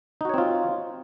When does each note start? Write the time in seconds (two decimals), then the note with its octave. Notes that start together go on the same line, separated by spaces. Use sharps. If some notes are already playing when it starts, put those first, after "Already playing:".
0.21 D#4
0.25 F#4
0.29 C#5
0.34 C4
0.38 F4